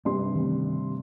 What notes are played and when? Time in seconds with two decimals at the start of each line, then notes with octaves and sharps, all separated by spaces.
0.05 G2 C3 C4 C#4 C6
0.35 D#3 E3 A3